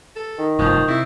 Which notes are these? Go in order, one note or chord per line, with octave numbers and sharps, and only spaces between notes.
A4
D#3
F1 G2 F3 C#6 D#6 G6
C3 E4